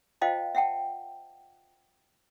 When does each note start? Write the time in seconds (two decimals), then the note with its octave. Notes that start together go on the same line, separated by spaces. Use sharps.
0.21 F4 C5 D#5 F5 G5 A5
0.55 E5 F#5 G5 A5